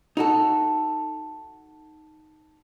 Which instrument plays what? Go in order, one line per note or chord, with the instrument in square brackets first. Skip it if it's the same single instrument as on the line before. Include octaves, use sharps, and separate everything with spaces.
[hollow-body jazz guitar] D#4 F#4 A4